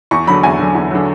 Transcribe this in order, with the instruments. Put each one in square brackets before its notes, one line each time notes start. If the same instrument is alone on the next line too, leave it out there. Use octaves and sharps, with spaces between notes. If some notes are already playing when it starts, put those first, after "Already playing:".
[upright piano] E2 C#6
D3 F#3 B5
E2 G#5
D3 F#3
E2
D3 F#3